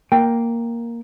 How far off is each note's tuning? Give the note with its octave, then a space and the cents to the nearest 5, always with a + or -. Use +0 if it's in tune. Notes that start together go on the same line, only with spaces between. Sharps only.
A#3 +0 G5 +5